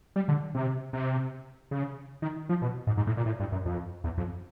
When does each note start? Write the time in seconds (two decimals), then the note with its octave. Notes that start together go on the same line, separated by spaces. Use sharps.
0.16 G3
0.28 D3
0.55 C3
0.93 C3
1.71 C#3
2.22 D#3
2.49 F3
2.62 B2
2.87 G#2
2.97 G#2
3.07 A2
3.17 A#2
3.26 A2
3.40 G2
3.52 F#2
3.66 F2
4.04 E2
4.18 F2